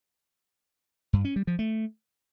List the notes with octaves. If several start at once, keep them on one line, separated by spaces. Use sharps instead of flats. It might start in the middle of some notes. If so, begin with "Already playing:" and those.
G2
C#4
G3
F3
A3